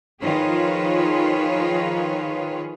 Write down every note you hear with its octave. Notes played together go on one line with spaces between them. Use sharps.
D#3 F3 F4 G#4 B4 C#5